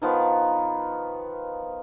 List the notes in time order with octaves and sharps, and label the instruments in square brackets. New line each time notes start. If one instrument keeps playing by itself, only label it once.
[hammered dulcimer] D#3 F3 B3